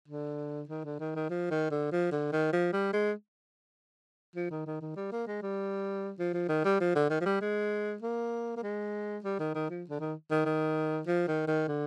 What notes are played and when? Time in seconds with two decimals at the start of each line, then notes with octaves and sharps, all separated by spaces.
0.08 D3
0.69 D#3
0.84 D3
1.00 D#3
1.16 D#3
1.30 F3
1.51 D#3
1.71 D3
1.92 F3
2.12 D3
2.33 D#3
2.53 F3
2.73 G3
2.93 G#3
4.36 F3
4.51 D#3
4.67 D#3
4.81 D#3
4.96 G3
5.12 A#3
5.27 G#3
5.42 G3
6.19 F3
6.34 F3
6.49 D#3
6.65 G3
6.81 F3
6.95 D3
7.10 D#3
7.21 F3
7.26 G3
7.41 G#3
8.02 A#3
8.57 A#3
8.63 G#3
9.24 G3
9.40 D#3
9.55 D#3
9.70 F3
9.89 D3
10.00 D#3
10.31 D#3
10.46 D#3
11.07 F3
11.28 D#3
11.47 D#3
11.68 D3